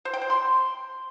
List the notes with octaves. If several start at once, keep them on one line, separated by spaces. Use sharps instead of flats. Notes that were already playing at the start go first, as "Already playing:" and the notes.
C5
G5
C5
C6